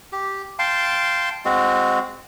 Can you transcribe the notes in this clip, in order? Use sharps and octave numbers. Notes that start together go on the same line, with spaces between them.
G4
F5 G5 A5 C6
G#3 C4 F#4